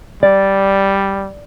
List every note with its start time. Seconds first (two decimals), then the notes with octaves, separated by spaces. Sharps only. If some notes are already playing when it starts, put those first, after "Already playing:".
0.23 G3 D5